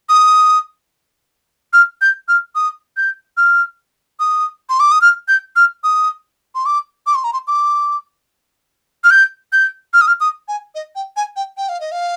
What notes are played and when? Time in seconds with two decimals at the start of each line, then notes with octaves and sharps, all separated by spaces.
0.09 D#6
1.73 F6
2.01 G6
2.28 F6
2.55 D#6
2.97 G6
3.37 F6
4.20 D#6
4.69 C6
4.80 D6
4.91 D#6
5.01 F6
5.28 G6
5.56 F6
5.83 D#6
6.55 C6
6.66 D6
7.06 D6
7.15 C6
7.24 A#5
7.33 C6
7.47 D6
9.04 F6
9.11 G6
9.52 G6
9.93 F6
10.01 D#6
10.07 F6
10.20 D#6
10.48 G#5
10.75 D#5
10.95 G5
11.16 G#5
11.36 G5
11.57 G5
11.69 F5
11.80 D#5
11.92 F5